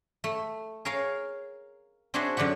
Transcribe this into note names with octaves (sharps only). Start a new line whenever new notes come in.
A3
G#4 A#4 C#5 F5
C4 D4 F#4 G#4 C5 E5
F#2 D3 D4 G4 F#5